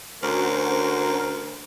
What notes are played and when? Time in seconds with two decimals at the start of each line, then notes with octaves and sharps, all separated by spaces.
0.23 D2 C#4 F#4 A#4 C5 F6